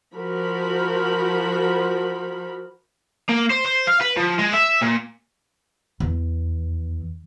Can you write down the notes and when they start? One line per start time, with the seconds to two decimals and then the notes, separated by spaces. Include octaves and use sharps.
0.14 F3 F#4 A#4 B5
3.29 A#3
3.50 C5
3.65 C5
3.87 F5
4.01 B4
4.17 F3
4.39 G#3
4.53 E5
4.82 A#2
6.00 E2